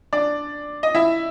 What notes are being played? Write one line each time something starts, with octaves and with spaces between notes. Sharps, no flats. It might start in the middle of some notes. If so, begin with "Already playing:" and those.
D4 D5
D#5
E4 E5